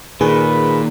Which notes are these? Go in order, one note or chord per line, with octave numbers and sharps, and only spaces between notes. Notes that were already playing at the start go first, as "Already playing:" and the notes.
A#2 D#3 G#4 B4